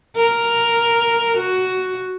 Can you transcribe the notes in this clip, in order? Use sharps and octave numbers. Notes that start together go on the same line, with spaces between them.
A#4
F#4